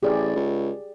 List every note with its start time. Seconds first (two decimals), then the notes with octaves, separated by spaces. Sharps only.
0.03 A1 G4 G#4 D5
0.35 C#2